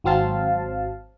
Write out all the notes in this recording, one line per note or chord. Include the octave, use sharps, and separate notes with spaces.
G#1 F#3 C4 F5 A5